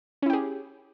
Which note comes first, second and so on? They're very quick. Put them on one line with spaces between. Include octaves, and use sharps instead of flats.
C#4 E4 G4 G#4